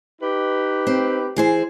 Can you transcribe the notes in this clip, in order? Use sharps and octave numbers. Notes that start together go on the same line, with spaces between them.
D#4 G4 B4
C4
E3 G#4 C5